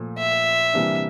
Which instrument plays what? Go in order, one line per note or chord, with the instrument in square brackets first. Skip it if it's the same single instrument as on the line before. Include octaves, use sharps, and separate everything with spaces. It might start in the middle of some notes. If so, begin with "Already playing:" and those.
Already playing: [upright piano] A#2 F3 A3
[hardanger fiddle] E5
[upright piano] C3 E3 G3 A#3 D4